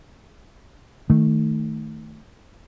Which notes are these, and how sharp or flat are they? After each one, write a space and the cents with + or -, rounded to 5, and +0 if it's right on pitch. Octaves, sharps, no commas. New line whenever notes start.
D#3 +0 A3 +0